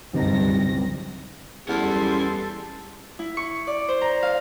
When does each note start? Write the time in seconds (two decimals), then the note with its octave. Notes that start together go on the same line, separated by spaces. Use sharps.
0.13 D1 C#2 G2 C3 D#4 A#6
1.69 E2 G3 C#4 A4 F#5 C6
3.19 E4
3.37 C#6
3.67 D5
3.88 C5
4.01 A#5
4.23 F5